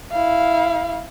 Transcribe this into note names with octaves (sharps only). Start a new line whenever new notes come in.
E4 F5